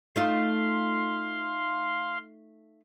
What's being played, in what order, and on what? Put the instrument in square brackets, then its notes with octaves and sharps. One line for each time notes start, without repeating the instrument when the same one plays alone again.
[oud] A3 D#4 F4 [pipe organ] F5 C6